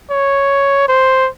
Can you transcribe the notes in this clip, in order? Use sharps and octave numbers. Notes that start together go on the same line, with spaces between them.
C#5
C5